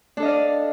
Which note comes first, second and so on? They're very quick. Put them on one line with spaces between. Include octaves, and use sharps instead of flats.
D4 A4 D#5 F5 D5